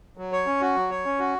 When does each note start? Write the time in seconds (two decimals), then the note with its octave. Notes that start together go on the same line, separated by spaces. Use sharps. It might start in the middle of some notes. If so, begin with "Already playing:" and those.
0.17 F#3
0.32 C#5
0.46 C#4
0.61 F#4
0.76 F#3
0.90 C#5
1.05 C#4
1.19 F#4